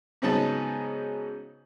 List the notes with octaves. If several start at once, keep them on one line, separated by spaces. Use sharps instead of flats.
G#2 C#3 F#3 B3 D#4 A5